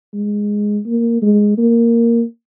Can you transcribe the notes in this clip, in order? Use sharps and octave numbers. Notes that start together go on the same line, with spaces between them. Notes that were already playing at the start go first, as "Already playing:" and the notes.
G#3
A#3
G#3
A#3